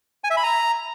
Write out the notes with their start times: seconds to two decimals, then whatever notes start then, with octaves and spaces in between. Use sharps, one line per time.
0.24 G#5
0.30 E5
0.37 B5
0.43 A#5